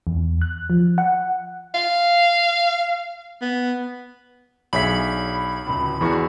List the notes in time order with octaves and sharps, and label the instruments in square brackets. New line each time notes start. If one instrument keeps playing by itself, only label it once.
[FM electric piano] E2
F#6
F3
F#5
[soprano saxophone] F5
B3
[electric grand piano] B1 C#5 B6 [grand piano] D4 G#4 E5 [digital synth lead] B5
[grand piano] D1 C#2
[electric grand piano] E2 E3 C#6 [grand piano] G#3 F#4